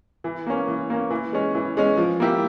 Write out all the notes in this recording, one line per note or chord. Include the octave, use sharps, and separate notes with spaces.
E3
A#3 C#4
E3
A#3 C#4
E3
G#3 C#4
E3
G#3 C#4
F3
A#3 E4 G4